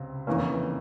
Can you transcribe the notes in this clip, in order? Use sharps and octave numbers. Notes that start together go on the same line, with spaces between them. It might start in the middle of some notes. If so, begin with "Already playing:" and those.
Already playing: C#2 C3
F1 E2 E3 A#3 C#4